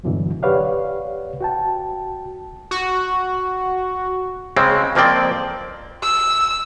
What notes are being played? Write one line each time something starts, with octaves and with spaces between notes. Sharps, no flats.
E2 G2 B2 D3 E3 F#3
G4 B4 C#5 D5 F5 F#5
F#4 G5 A5
F#4
C#3 G#3 C4
F2 F3 A#3 C4 D5 G5
E6